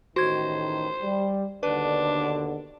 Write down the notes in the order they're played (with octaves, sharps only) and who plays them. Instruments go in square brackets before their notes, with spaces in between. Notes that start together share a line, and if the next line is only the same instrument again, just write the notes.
[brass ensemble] A1 A2 D#3 [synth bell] F#4 G#6 [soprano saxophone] C5
[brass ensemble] G3
[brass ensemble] D#2 B2 D3 [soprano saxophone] D4 [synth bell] B4